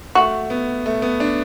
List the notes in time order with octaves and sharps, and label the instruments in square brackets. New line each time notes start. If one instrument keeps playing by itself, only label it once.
[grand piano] A3 [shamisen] F#4
[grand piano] B3
A3
B3
D4